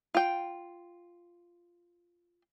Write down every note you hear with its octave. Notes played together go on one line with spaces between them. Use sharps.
F4 G5